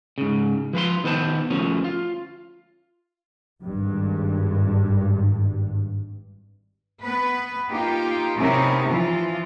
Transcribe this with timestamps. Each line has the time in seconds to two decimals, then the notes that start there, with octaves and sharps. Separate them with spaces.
0.18 G#2 C#3
0.73 F3 B4 F5 C6
1.04 D#3 B3 B4 C5 G5 A5
1.50 D2 F3 C#4
1.84 F4
3.64 G#1 G2
7.00 B3 B4
7.69 A#3 D#4 F4 G4
8.37 C3 B3 C#4 D#4 E4 A#4
8.89 E3 F3 F4